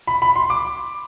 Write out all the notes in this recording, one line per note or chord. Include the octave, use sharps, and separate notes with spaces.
B5
B5
C6
D6